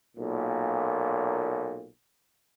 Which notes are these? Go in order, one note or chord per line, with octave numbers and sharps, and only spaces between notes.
B1 A#2